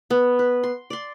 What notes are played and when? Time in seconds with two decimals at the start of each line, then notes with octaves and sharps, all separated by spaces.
0.10 B3
0.39 B4
0.63 C6
0.90 D5 C6